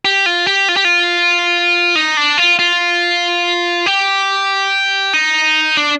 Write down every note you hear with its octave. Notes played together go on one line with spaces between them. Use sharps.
G4
F4
G4
F4
G4
F4
D#4
D4
F4
F4
G4
D#4
D4